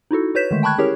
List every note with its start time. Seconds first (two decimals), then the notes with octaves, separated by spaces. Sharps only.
0.11 D#4 E4 F#4 A4
0.35 F#4 B4 C#5 G6 B6 E7
0.51 D3 D#3 G#3 A3
0.63 G5 A5 B5 C#6 F#6 G#6
0.78 C#4 E4 G4 G#4 A#4 C#5